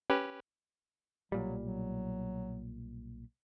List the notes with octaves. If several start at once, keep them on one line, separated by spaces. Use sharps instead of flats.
C#4 G4 B4
B1 A#2 F#3 G3
F#3